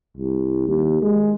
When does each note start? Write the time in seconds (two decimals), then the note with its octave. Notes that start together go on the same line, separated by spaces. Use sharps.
0.17 C2
0.68 D#2
1.02 G#3